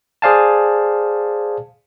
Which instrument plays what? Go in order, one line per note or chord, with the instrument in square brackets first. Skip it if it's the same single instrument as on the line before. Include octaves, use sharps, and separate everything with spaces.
[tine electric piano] G#4 C5 D5 F5 G#5 A5